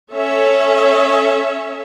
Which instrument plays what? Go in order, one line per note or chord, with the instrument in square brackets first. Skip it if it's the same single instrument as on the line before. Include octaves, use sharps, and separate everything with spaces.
[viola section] C#4 A4 C#5 E5